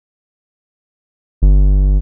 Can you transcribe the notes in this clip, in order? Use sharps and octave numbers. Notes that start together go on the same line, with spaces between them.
G1